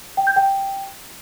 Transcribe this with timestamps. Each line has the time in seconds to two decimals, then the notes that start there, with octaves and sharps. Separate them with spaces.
0.17 G5
0.27 G6
0.36 G5